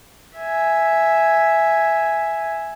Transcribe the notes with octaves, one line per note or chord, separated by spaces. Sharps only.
E5 G#5